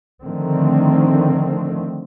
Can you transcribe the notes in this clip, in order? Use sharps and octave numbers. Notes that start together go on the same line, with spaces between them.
D3 D#3 F3 A3 C4